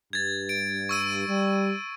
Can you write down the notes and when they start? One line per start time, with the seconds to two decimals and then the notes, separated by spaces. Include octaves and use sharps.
0.13 G2 G#6 A6
0.49 D7
0.89 C#6 E6 D#7
1.28 G3